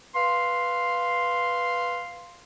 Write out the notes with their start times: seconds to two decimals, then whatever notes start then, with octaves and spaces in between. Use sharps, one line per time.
0.15 B4 F5 C6